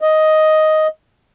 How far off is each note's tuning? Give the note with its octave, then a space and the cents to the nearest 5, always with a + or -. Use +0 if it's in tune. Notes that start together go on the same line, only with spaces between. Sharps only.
D#5 +5